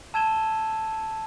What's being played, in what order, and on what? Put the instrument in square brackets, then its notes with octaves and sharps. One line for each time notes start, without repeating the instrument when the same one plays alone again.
[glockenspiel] A5 E6 G#6 D#7 E7 G7